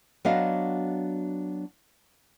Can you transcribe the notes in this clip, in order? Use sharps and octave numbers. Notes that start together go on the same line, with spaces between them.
F#3 B3 D4 F#4 D#5 F5